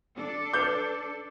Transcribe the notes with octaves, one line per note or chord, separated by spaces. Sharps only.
D4 A4 D5
B4 C#5 D6 G6